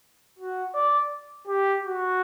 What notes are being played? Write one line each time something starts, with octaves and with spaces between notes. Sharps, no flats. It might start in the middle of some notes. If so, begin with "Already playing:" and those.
F#4
D5
G4
F#4